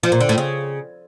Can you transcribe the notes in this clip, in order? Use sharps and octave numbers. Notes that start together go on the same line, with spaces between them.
F3
A#2
D3
A2
C#3